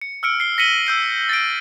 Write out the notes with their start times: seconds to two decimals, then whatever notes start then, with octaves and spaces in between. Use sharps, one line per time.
0.01 C#7
0.23 E6 F6 C#7 D7
0.40 C7 G7
0.58 A#6 B6 C#7 D#7 F#7 G7
0.87 E6 G6 C7
1.29 A6 A#6 D7